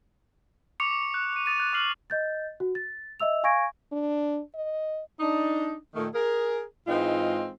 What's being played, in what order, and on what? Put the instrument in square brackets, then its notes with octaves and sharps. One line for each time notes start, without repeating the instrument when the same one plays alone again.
[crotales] C#6 D6 C#7 F7
F#6
C#6 D#7
D#6 A6 D#7
F#6 D#7
C#6 D6 F6 C7 F#7
[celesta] D#5 G6 A6
F#4
A6
D#5 E5 E6 F7
F5 G#5 C#6 G#6 A#6 D7
[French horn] D4
D#5
[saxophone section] D4 D#4
A#2 D#3 A3
G#4 A#4
G#2 E3 G#3 C4 D#4 F4